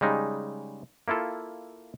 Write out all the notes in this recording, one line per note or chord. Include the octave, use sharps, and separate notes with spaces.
C#3 G3 G#3 D#4
A#3 E4 F4 A4